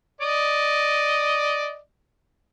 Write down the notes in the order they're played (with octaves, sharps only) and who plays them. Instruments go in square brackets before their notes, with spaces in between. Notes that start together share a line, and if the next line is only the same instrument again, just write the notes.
[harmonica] D5 D#5